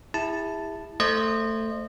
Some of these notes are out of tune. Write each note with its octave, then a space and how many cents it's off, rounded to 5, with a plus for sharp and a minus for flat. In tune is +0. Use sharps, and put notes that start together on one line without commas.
E4 -5 G#4 -45 A5 +0
A3 +15 C5 +0 D#5 -30